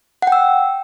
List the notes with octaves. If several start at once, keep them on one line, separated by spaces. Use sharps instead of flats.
F#5 G5 E6